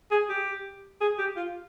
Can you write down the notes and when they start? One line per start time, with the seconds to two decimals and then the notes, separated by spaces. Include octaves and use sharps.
0.11 G#4
0.30 G4
1.01 G#4
1.19 G4
1.36 F4